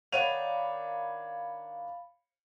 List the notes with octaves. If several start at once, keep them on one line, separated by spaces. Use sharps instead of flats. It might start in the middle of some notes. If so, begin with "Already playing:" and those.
D#3 D4 C#5 F5 F#5 B5 D#7 F7